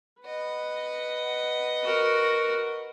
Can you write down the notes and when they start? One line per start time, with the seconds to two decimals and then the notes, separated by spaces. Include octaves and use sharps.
0.23 B4 D#5 F#5
1.84 F#4 A#4